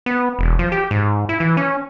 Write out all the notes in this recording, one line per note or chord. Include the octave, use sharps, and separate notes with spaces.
B3
E1
F3
G4
G#2
E4
E3
C#4